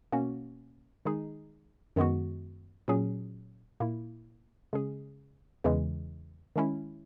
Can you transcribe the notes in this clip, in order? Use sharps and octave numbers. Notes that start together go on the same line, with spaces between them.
B2 A#3 C#4 F#4
D#3 G#3 D#4 G#4
F#2 D#3 G#3 B3 F#4
A#2 F#3 C#4 G#4
A#2 A#3 E4
C#3 G#3 C#4 G#4
E2 C#3 E3 G#3
D#3 G#3 C#4 E4